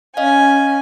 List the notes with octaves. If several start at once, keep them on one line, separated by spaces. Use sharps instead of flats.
C#4 D#5 F5 G#5